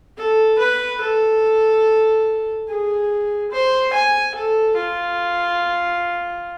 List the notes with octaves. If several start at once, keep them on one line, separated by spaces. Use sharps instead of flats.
A4
B4
A4
G#4
C5
G#5
A4
F4